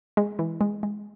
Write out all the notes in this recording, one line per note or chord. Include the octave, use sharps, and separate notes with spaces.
G#3
E3
G#3
G#3